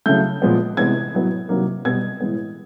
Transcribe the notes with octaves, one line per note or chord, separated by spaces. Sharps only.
C#3 F#3 A3 G6
A#2 F3 G#3 B3
C3 E3 G#3 B3 G#6
A2 F#3 B3
C3 D#3 F#3 A#3
B2 G3 B3 G#6
A2 E3 G#3 B3